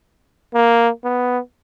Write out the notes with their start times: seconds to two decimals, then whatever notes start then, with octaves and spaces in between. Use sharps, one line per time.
0.54 A#3
1.04 B3